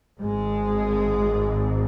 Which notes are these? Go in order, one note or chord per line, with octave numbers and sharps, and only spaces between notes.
G#1 G#2 G#3